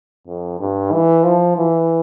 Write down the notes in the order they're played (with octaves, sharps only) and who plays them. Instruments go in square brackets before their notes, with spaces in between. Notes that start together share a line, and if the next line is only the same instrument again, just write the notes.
[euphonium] F2
G2
E3
F3
E3